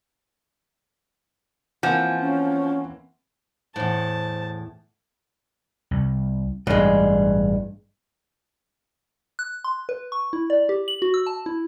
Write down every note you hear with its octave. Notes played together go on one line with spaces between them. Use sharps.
E3 F3 A#3 C4 F#5 G#5
C#4
E2 A2 C5 A5
C2
A1 G2 B2 G#3
F#6
C6
B4
C#6
E4
D5
G4
F#7
F#4
E6
A5
E4